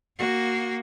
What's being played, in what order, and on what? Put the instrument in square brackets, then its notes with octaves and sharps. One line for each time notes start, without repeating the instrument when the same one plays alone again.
[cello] A#3 F#4